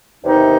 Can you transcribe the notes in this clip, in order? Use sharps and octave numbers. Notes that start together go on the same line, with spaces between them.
E2 C3 D#3 D#4